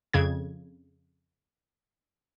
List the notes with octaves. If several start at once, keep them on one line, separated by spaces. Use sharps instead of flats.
F2 C#3 G#6